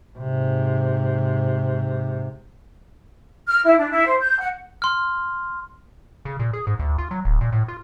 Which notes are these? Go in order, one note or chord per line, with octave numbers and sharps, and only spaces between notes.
G#2 C3
F6
E4
D4
E4
C5
G6
F#5
C6 F6
C#3
A#2
G#4
G#2
D2
F4
F#3
D1
A#2
A2
F4